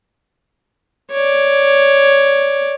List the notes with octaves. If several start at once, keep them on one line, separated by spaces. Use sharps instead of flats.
C#5 D5